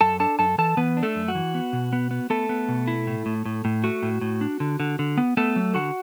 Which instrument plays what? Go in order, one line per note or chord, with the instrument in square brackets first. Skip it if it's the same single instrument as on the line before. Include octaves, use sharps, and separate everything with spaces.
[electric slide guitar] F#2 A4 A5
D4 A4 A5
F#2 A4 A5
E3 A4 A5
E3 B3 B4
D4
A3 A4
F#2
F#4
E3
B3
B2
B3
B3
A3 B3 A4
B3
B2
E4
A2
A2
A2
A2
A3 F#4
A2
A2
D4
D3
D3
D3
B3
A3 B3 A4
F#3
D3 F#4 F#5